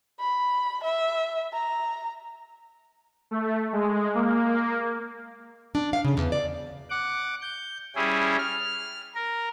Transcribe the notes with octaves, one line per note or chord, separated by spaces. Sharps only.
B5
E5
A#5
A3
G#3
A#3
D4
F5
C#3
E2
D5
F#5 D6
G6
G3 C#4 E4 G#4
F6
A#4